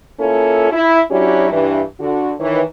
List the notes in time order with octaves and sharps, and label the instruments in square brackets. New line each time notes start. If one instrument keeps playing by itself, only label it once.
[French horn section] A#3 C#4 E4 F4 A4
E4
F#3 C#4 D4 E4 F#4 G4
G2 E3 D4
D3 F#4
D#3 E3 C#5